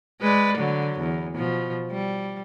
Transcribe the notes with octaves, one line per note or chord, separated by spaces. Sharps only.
G#3 B4 D5
D3 F#3
E2
B2 F3
G3